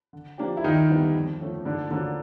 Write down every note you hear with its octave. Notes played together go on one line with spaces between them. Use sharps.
D3
F3 A#3 D4 G4
E4
D#2 D#3 D#4
D3 G3 B3 E4
F2
D3 F3 A3 C#4
G#2 D3 D4
D3 F3 A#3 C#4 D4 F#4